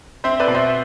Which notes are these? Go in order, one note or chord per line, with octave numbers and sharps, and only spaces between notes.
C4 C5 E5
B4 D5
B2
C5 E5